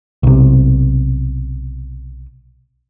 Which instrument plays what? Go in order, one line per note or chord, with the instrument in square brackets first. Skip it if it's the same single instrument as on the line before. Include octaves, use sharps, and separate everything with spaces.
[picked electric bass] B1 C3